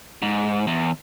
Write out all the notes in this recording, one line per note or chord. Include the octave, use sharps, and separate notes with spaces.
G#2
E2